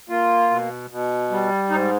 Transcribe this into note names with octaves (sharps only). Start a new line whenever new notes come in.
A#3 F4
B2
B2
G3
G#2 D#4